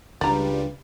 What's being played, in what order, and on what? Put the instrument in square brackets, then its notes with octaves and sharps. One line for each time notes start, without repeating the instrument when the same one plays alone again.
[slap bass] C#2 D4 [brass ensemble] C#3 F4 B4 [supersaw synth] G3 [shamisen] D5 A#5